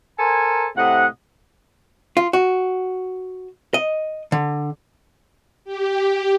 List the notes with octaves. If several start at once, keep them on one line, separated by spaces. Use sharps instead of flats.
A4 A#4 C5 G#5
A2 C3 D#5 F#5
F4
F#4
D#5
D3
G4